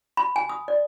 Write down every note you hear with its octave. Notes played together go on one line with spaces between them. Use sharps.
B5
G#5
D#6
D5